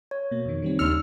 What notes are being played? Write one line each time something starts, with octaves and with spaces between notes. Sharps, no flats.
C#5
B2 A#3
F2 D#3
D#3 G3 C4
D#2 C#3 D4 C6 E6 F6 C#7